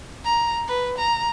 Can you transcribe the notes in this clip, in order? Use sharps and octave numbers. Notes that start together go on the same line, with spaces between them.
A#5
B4
A#5